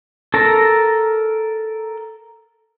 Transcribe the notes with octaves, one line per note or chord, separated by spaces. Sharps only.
A4 A#4 A#5